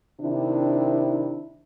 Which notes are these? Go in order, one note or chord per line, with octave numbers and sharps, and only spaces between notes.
C3 D#3 D4 E4